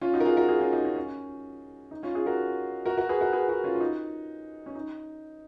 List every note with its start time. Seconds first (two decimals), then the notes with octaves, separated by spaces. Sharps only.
0.01 C#4 F4
0.14 D#4 F#4
0.20 A#4
0.25 F4 G#4
0.37 F#4 A#4
0.49 F4 G#4
0.61 C#4 F4
0.73 D#4
0.84 C#4
0.96 C#4
1.91 D#4
2.03 C#4 F4
2.15 F4 G#4
2.26 F#4 A#4
2.86 F#4 A#4
2.97 F#4 A#4
3.09 G#4 B4
3.21 F#4 A#4
3.33 G#4 B4
3.49 F#4 A#4
3.64 C#4 F4
3.75 F4
3.81 D#4
4.66 C#4
4.75 D#4